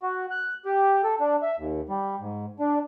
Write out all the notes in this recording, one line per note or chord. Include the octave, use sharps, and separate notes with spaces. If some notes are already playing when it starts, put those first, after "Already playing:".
F#4
F#6
G4
A4
D4
E5
D#2
G3
G#2
D4